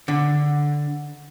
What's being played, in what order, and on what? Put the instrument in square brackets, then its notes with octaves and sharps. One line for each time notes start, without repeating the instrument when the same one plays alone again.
[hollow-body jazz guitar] D3